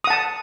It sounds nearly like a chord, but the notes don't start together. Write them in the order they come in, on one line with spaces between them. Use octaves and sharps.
D#6 F#5 A5